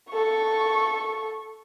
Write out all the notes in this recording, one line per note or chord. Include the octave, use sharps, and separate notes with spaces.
A4 C#6